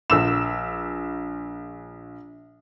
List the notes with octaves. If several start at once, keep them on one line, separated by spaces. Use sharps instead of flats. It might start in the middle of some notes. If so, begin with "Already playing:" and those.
A#1 E6 E7